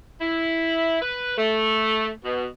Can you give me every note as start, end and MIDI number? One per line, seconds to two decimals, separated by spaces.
0.21 0.99 64
1.02 1.32 71
1.38 2.11 57
2.24 2.46 47